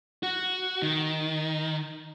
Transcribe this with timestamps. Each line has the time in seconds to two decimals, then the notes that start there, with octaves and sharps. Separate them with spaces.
0.23 F#4
0.82 D#3